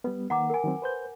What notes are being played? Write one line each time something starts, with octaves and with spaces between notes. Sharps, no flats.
G3 B3 B4
D#3 A#3 F#5 A#5 D6
A#4 G#5
D#3 F#3 C4
B4 C5 G6